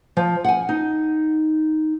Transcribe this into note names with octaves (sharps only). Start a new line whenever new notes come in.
F3
F#5 G#5
D#4